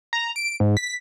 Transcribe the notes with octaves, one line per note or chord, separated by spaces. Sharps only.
A#5
D7
G#2
B6